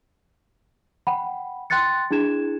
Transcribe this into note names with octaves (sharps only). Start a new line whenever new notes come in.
F#5 G5 B5
G5 C6 F#6 A6 C#7
D4 E4 G#4 G#6 E7